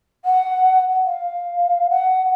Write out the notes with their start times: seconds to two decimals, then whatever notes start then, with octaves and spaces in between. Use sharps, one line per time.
0.25 F#5
1.05 F5
1.90 F#5